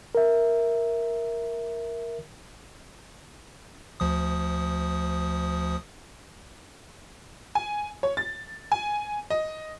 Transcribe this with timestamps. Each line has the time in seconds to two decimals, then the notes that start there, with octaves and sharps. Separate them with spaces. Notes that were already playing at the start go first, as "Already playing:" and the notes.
0.15 A#4 E5
4.00 D2 F3 D#6
7.55 G#5
8.03 C#5
8.17 A6
8.72 G#5
9.30 D#5